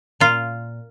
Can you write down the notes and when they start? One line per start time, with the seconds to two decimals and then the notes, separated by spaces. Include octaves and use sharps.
0.20 A#2 F4